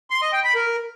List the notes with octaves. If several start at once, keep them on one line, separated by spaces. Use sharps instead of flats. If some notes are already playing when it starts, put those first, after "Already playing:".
C6
D#5
G5
B5
A#4